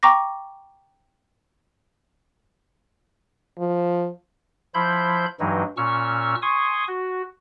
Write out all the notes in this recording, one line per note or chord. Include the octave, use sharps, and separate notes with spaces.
G5 A#5 C#6 D6 A#6
F3
F3 E4 C5 B5 G6
G2 E3 F#3 G#3 D#4
A#2 C#4 C#6 E6 F6
G#5 C6 C#6 D#6
F#4